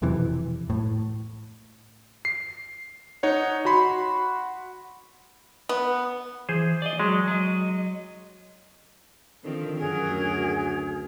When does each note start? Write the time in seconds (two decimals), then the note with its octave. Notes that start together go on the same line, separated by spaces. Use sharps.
0.02 E1 F2 C3 E3
0.70 A2
2.25 C7
3.23 D#4 C#5 F#5
3.65 F#4 F#5 B5 C6
5.69 B3
6.49 E3 G#4 C5
6.82 D5 D#5
7.00 F#3 G#3
7.28 F#3 D#5
9.44 D3 D#3 F3 C4
9.77 F#2 F#3 G#4 A#4
10.09 D2